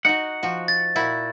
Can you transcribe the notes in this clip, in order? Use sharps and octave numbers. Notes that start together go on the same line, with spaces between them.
D#4 F#4 F#5
F3 F#4
A6
A#2 E4 F#4